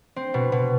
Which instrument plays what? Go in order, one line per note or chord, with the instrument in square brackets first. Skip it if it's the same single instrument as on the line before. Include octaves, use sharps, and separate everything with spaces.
[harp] C4
B2
B2